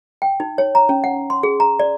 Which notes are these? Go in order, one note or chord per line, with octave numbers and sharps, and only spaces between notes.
G5
D#4
C#5
A#5
C#4
F#5
C6
G#4
A#5
D5